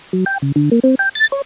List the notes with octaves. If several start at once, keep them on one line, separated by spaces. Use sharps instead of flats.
F#3
G5
C#3
D3
A#3
C4
G5
A6
C#5